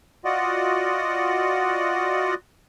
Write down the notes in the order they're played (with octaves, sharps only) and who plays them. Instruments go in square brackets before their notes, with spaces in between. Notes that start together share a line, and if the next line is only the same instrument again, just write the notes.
[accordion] F4 F#4 D5 D#5 F#5